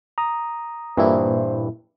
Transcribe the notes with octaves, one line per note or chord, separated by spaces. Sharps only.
A#5 D#6
G2 A#2 E3 A#3 E4 C5